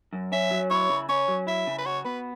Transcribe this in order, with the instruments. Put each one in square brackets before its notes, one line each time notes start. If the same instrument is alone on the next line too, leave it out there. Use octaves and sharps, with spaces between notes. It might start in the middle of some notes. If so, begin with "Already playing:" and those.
[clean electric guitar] F#2
[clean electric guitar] C#4 [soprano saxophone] E5
[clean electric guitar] F#3
[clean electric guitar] E4 [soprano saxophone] C#5
[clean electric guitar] C#3
[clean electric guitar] C#4 [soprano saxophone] C#5
[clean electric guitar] F#3
[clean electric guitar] E4 [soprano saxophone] E5
[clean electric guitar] C#3
[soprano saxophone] B4
[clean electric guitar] F#4 [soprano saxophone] C#5
[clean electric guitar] B3 [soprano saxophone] B4